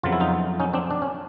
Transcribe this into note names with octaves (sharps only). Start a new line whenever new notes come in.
F2 C#3 F#3 B3 F4
E4
D#4 F4
C#4 D#4
C4 D4
D4
C#4